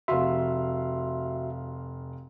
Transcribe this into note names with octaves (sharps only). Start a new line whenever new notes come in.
F1 F#4 E5 F5 C6